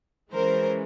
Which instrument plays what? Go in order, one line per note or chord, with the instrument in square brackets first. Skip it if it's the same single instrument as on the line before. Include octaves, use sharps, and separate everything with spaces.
[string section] E3 G#3 C#4 A#4 C5